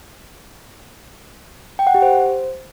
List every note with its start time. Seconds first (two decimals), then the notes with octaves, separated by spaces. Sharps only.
1.79 G5
1.87 F#5
1.94 G4
2.02 C5